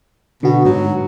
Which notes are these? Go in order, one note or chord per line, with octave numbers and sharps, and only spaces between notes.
B2 D3 F#4
G#2 F#3